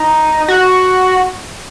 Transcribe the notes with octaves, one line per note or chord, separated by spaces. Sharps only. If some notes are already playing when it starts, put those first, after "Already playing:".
Already playing: D#4
F#4